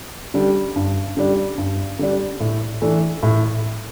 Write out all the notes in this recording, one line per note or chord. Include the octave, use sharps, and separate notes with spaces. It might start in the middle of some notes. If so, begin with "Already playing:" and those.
D3 G3 D4
G2
D3 G3 D4
G2
D3 G3 D4
A2
E3 A3 D4
A2